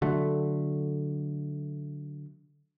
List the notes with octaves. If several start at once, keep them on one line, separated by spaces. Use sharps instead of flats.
D3 F#3 A3